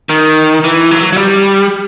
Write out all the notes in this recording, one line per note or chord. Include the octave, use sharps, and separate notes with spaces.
D#3
E3
F#3
F#3
G3